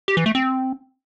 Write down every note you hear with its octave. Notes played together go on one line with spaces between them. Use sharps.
G4
E3
A3
C4